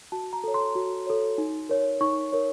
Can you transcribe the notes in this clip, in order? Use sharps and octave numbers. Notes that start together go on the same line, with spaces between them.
F#4 A5
A#5
A4 C#5
C6
F#4
A4 C#5
D#4
A#4 C#5
D#4 C#6
A#4 C#5